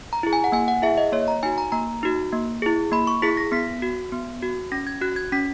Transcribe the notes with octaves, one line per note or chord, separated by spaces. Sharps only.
A#5
E4 G#4
G#5
F#5
A#3 G#5
F#5
E4 G#4 E5
D#5
A#3 C#5
A#5
D#4 F#4 G#5
A#5
A#3 A#5
D#4 F#4
A#3
E4 G#4
A#3 B5
C#6
E4 G#4 B6
A#6
B3 B6
F#4
B3
F#4
C#4 A#6
G#6
F#4 F#6
G#6
C#4 B6